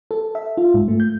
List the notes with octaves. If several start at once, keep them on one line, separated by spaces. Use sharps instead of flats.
A4
E5
F4
G#2
A3
G6